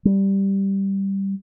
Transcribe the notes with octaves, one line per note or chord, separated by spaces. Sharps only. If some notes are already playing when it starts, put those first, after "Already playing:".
G3